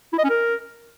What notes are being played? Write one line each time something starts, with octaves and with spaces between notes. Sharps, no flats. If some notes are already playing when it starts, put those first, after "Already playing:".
E4
D#5
C#4
A#4